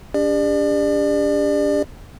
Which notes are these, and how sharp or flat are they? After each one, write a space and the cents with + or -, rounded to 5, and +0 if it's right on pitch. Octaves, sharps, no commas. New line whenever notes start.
D4 -35 G4 +45 D5 +30